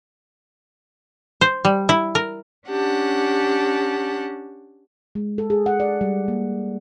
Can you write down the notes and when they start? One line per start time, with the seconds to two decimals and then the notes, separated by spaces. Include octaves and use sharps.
1.41 C5
1.65 G3
1.89 E4
2.15 A#4
2.68 C#4 D4 G4 F#5 A5
5.15 G#3
5.38 A4
5.50 G#4
5.66 F#5
5.80 D5
6.01 G3
6.28 A#3